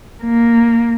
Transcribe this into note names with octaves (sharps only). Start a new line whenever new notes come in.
A#3